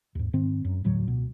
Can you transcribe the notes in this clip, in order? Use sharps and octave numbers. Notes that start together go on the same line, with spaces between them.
D#2 G#2
G#2 D#3 C4
F#2
E1 D2 A2 F#3
C#2 B2